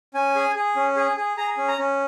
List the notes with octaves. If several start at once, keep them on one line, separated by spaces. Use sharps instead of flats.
C#4 G#5
G#4
G#4
C#4
G#4
G#4
G#4 A#5
C#4
A#5
C#4